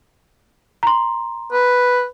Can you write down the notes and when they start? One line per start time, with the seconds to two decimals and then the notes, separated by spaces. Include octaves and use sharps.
0.83 A#5 C6
1.52 B4